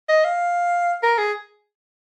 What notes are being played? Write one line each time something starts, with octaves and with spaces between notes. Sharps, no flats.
D#5
F5
A#4
G#4